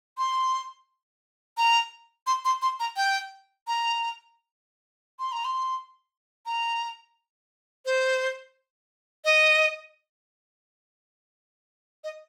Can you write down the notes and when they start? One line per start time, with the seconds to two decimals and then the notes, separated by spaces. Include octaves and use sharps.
0.18 C6
1.57 A#5
2.27 C6
2.45 C6
2.62 C6
2.80 A#5
2.96 G5
3.67 A#5
5.19 C6
5.32 A#5
5.45 C6
6.46 A#5
7.85 C5
9.25 D#5
12.04 D#5